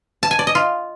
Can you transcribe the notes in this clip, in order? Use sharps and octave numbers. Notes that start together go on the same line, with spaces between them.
A5
G#5
D5
D#5
F4